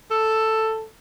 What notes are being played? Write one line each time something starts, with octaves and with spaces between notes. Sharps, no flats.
A4